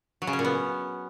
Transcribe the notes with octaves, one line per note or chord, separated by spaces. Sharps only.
F#3
C#3
C#4
A#2
B3